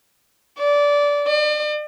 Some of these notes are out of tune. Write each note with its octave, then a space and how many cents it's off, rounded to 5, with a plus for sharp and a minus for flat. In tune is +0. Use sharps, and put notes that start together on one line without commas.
D5 -20
D5 +40